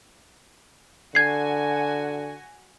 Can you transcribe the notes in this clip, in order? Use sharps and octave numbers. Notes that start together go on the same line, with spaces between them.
D3 F#4 G#5 G#6 C7